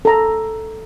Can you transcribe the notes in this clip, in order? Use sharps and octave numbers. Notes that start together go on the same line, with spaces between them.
A4 A#5